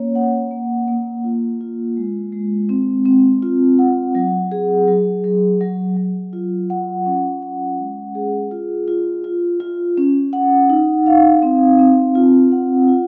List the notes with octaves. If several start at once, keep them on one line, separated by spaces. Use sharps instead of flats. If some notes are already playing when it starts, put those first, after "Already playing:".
Already playing: A#3 C#4 C#5
F#5
A#3
A#3
F4
F4
G#3
G#3
C4
C4
F4
F#5
F#3
G#4
F#3
F#3
F#3
F#3
F4
F#5
C#4
F#5
G#3
G#4
F4
F4
F4
F4
C#4
F#5
D#4
F5
C4
C4
F4
F#5
F4